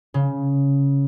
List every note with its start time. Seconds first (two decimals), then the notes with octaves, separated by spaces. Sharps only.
0.14 C#3